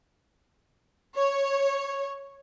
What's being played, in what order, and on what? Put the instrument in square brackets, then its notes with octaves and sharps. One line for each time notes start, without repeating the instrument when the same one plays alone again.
[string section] C#5